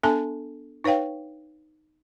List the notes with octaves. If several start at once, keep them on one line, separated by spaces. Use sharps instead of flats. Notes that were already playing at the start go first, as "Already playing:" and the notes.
B3 D4 A4 E5 G#5 A5
D#4 B4 C#5 F5 G5